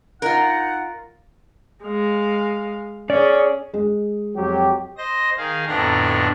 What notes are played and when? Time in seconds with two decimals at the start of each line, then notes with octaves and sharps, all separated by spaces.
0.22 D#4 F4 A#4 F#5
1.84 G#3 F5
3.10 C#4 G#4 D5
3.74 G#3
4.36 F2 F#3 G4
4.97 C5 D#5 A#6
5.37 D#3 G#4 F5
5.67 F2 A2 D3 B3 D4 A#5